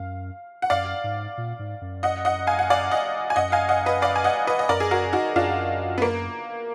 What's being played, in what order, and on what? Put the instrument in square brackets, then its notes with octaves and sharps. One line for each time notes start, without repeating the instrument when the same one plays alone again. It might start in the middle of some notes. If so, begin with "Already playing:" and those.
Already playing: [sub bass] F#2 [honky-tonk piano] F5
[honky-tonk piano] F#5
[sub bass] F#2 [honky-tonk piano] D5 F5
[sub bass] G#2
A#2
G#2
F#2
[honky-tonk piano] D#5 F#5
D#5 F#5
F5 G#5
F#5
D5 F5
D#5 F#5
G#5
[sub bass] F#2 [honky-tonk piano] D#5 F#5
[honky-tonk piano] F5 G#5
D#5 F#5
B4 D#5
D5 F5
G#5
D#5 F#5
B4 D#5
D#5
[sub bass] F#2 [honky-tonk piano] A#4 D5
[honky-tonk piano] G#4
F#4 A#4
D#4 F#4
[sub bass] F#2 [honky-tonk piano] D4 F4
[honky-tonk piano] B3
A#3